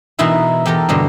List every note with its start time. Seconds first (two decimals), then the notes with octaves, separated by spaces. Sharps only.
0.19 B2 E3 D#4 E4 A#4
0.66 E2 G4 A4 A#4
0.89 G2 B2 D3